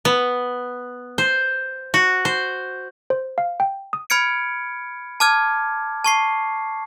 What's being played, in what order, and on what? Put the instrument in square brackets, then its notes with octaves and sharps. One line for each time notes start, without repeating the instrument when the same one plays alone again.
[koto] B3
C5
F#4
C5
[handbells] C5
F5
G5
D#6
[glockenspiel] B5 F6 G#6 C#7 D7
A5 D6 F6 G#6
A5 C#6 C7